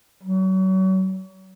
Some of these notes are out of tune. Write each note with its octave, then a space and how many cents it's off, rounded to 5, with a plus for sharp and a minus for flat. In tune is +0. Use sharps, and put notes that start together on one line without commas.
F#3 +35